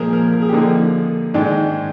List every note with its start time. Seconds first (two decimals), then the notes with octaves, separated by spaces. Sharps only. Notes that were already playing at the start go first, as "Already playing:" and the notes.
Already playing: A#2 F3 G#3 G#4 A#4 G#5
0.13 A#4
0.33 A#4
0.42 G#4
0.49 G4
0.53 D3 F3 A#3 D#4 G#4
1.34 G#2 D#3 G#3 D4